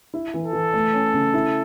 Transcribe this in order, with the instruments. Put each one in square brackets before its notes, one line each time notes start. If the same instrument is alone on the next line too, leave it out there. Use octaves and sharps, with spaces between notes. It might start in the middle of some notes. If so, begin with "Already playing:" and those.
[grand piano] E4
E3
[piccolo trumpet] A4
[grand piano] E3
A3
C#4
C#3
E4